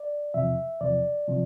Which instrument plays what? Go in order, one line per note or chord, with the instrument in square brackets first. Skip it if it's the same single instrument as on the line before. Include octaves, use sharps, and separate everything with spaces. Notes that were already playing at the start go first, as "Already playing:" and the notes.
Already playing: [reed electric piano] D5
E2 C3 F3 E5
E2 C3 F3 D5
C3 F3